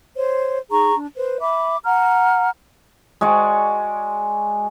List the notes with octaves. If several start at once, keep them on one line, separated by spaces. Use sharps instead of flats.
C5 C#5
D#4 G#4 A#5 C#6
D4
B4 C5
E5 B5 D6
F#5 A#5 F6
G#3 F#4 D5 C#6